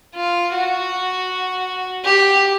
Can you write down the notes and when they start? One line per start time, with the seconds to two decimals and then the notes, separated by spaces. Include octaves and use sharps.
0.16 F4
0.53 F#4
2.04 G4